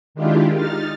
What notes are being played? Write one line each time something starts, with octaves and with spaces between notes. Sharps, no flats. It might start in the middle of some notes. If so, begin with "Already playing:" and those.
D#3 G#3 D4 E4 F4 G4
D#4 F6 A6